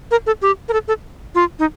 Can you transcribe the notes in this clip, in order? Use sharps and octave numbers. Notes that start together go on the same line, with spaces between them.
A#4
A4
G4
A#4
A4
A4
F4
D#4